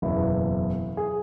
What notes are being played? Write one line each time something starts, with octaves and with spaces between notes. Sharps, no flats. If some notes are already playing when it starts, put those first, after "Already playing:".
F#1 E2 B2 A#3 E4
G#4